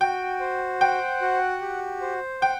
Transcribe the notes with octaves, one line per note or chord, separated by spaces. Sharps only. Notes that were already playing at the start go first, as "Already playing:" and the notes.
F#4 G5
C5
F#5 G5
F#4
G4
C5
F#5 G5